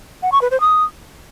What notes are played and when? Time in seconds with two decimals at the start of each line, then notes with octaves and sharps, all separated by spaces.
0.22 F#5
0.32 C#6
0.41 B4
0.51 C5
0.60 D#6